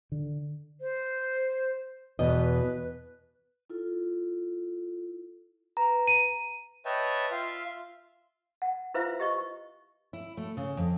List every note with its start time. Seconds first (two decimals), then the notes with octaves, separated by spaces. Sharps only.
0.12 D3
0.81 C5
2.19 E2 B2 B4 D#5
3.70 E4 F4 A4
5.77 B4 A#5
6.07 D#7
6.85 B4 C#5 D#5 E5 G5 A5
7.31 F4 E5 F5 C6
8.62 F#5
8.94 E4 F4 B4 C5 E5 F5
9.20 G4 D#5 C#6
10.13 E4
10.37 A3
10.57 C#3
10.77 F2